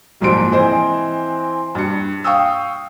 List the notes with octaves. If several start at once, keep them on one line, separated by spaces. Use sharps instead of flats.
F#1 C2 G#2 F3 C6 D7
E3 C4 C5 D#5 G#5
G2 C#7
F5 G5 C#6 D#6 E6